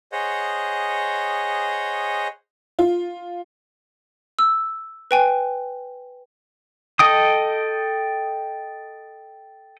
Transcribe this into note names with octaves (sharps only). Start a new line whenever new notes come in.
G#4 C5 C#5 D#5 F#5
F4
E6
B4 G5 G#5
A4 D#5 G5 D#6